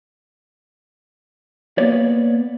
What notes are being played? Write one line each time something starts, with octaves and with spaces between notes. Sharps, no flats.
A#3 B3 B4 C#5 D5